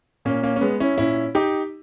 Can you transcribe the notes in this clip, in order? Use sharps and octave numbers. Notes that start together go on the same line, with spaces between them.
A#2 A#3 C#4
A#3 C#4
C#4
G#3 B3
C#4 E4
A#2 C#4 E4
D#4 G4